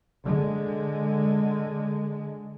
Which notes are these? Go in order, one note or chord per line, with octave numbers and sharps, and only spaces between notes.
D3 G#3